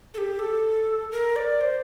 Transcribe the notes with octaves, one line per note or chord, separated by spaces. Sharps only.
A4
G4
A4
A#4
D5
C5